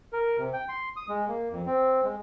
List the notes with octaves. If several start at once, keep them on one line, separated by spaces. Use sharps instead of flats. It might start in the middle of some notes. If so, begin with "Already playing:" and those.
A#4
C3
G5
C6
D#6
G#3
A#3
F2
C4
G#3